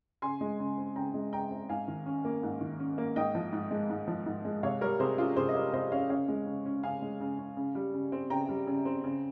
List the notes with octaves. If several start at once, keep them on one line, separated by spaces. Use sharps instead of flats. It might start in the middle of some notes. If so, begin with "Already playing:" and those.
C#3 G#5 C6
G#3
C#3
C4
C#3 G5 A#5
G#3
C#3 G5 A#5
C4
G#2 F5 G#5
D#3
C#4
A#3
G#2
D#3
C#4
A#3
G#2 D#5 G5
F3
G#2
G#3
G#2
F3
G#2
G#3
C3 C#5 F5
G3 A#4 C#5
C3 G#4 C5
C#4 F4 G#4
C3 G#4 C5
D#5
G3 A#4 C#5
C3 C5 D#5
C#4 C#5 F5
C#3 C#5 F5
G#3
C#3
C#4
C#3 F5 G#5
G#3
C#3
C#4
C#3
G3
C#3
C4
C#3 G5 A#5
G3
C#3
C4
C#3